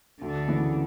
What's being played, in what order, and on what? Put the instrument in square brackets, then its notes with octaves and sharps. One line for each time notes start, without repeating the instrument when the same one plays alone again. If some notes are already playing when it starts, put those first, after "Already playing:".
[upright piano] D2 [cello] D3
[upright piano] C#3 E3 B3 E4